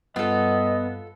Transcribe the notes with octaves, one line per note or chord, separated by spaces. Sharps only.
G2 G3 B3 F4 A4 D#5